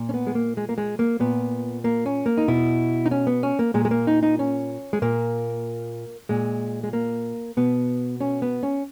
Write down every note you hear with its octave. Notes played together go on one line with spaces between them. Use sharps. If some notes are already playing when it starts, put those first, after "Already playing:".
Already playing: A#2
C#4
B3
G#3
A#3
G#3
A#3
G#3
A#3
A#2 B3
A#3
C#4
A#3
D#4
B2 E4
D#4
C#4
B3
C#4
A#3
A#2 G#3
G#3
A#3
D#4
D#4
C#4
G#3
A#2 A#3
A#2 G#3
G#3
A#3
B2 B3
C#4
B3
C#4